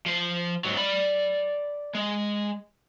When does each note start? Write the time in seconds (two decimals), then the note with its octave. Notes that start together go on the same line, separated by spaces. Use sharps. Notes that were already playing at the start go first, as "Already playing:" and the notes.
0.06 F3 C5
0.64 G#2 F#3
0.77 D5 B5
1.95 G#3